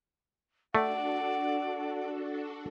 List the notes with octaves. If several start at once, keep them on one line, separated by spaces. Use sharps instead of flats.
A3 D4 F#4 A4 D5 F#5